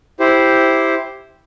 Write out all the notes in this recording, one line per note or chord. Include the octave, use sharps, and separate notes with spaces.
E4 G4 C5